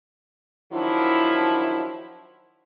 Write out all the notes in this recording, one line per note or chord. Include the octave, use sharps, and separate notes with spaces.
D#3 F3 F#3 D4 E4